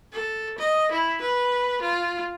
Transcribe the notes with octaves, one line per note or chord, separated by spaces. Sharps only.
A4
D#5
E4
B4
F4